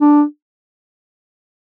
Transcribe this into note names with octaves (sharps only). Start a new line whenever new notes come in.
D4